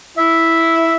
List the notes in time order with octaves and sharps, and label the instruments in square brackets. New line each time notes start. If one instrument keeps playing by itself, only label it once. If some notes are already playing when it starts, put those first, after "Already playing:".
[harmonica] E4 E5